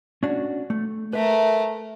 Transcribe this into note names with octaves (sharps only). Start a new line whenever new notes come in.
C#4 D4 F#4
A3
A3 A#4 B4 E5